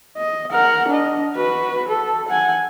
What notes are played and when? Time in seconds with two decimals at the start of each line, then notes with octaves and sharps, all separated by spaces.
0.17 D#5
0.51 A#4 F#5
0.88 D4 D#5
1.36 F#4 B4
1.88 A4
2.28 F#5 G#5